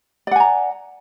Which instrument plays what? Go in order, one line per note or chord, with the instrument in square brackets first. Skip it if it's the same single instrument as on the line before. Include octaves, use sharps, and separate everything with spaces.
[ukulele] D5
F#5
G#5
A#5